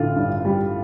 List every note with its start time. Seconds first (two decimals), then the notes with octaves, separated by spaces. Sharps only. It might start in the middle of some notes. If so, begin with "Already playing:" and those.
Already playing: A1 D3 F4
0.16 G2
0.45 G3